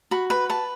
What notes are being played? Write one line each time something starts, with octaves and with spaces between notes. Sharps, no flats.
F#4 B5
B4 B5
B4 A5